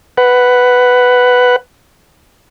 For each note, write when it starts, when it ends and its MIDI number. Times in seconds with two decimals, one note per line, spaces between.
0.18 1.56 71
0.18 1.56 78